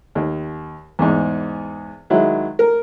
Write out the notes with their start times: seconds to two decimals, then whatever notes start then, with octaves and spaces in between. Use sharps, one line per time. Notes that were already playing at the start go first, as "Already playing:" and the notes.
0.15 D#2
0.99 E2 G#2
2.10 D#3 F#3 G#3 E4
2.59 A#4